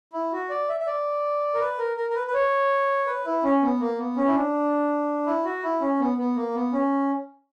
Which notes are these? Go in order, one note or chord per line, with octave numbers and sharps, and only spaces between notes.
E4
F#4
D5
E5
E5
D5
A#4
B4
A#4
A#4
A#4
B4
B4
C#5
B4
E4
C#4
B3
A#3
B3
C#4
E4
D4
E4
F#4
E4
C#4
B3
B3
A#3
B3
C#4